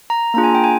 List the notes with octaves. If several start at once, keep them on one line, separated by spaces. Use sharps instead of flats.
A#5
A#3 D4 F4 G#4 A#5
G#5
G5
G#5